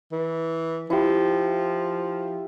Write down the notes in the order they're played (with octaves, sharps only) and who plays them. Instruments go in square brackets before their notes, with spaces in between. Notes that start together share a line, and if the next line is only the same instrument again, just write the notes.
[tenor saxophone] E3
[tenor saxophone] F3 [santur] E4 G4